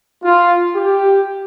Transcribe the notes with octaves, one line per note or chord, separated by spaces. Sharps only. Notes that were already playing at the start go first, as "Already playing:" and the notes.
F4
G4